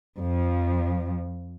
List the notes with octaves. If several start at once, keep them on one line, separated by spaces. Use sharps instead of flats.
F2 F3